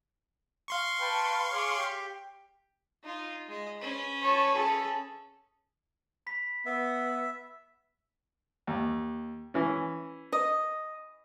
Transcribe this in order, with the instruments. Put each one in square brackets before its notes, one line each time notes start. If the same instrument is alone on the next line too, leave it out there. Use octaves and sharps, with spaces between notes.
[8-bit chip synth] F5 C6 C#6
[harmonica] B4 G5 A5
G#4 C#5 D6
G4
[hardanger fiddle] D#4 F4
G#3 D#5
C#4 B4
[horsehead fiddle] C#5 A5
G#4 A4
[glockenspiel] B5 B6
[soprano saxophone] B3 [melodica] E5
[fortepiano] D#2
E3 C#4
[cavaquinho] D#5